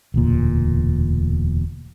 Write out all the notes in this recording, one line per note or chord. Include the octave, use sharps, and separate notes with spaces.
E1 D2 A#2